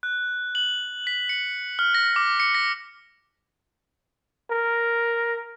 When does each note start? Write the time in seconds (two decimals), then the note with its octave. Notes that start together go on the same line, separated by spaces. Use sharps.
0.03 F#6
0.55 F#7
1.07 B6
1.29 C#7
1.79 F6
1.95 A#6
2.16 D6
2.40 C#7
2.55 A#6
4.51 A#4